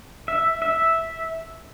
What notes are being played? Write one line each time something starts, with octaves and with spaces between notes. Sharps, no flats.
E5
E5